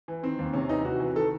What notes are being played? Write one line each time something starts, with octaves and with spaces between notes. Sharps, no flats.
E3
D#3 C4
D#2
C3 C#4
E3 D#4
C3 F#4
E3
D#3 A4